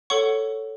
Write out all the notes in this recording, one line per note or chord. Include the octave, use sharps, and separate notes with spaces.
A4 C#5 F#5 C#6